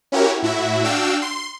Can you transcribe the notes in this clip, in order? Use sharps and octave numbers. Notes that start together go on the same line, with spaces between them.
C#4 E4 F#4 G4 A#4 C#5
A2 E4 F#4 E5
D4 F#4 F5 G5 E6
C6